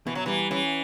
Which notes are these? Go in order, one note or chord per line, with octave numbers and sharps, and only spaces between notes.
B2 E3
F#3
E3 G3
E3 C#4